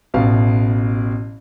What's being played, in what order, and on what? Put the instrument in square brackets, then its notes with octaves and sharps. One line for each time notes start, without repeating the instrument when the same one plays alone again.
[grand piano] A1 B2 F5